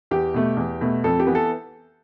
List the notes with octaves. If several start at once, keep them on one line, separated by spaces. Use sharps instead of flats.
E2 G4
B2 A3
E2
B2 A3
F2 A4
G4
E3 B3
A4